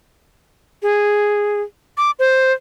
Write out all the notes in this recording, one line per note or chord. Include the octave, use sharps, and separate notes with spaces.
G#4
D6
C5